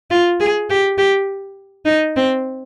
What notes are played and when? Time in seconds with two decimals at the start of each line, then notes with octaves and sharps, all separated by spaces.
0.11 F4
0.40 G#4
0.70 G4
0.98 G4
1.86 D#4
2.16 C4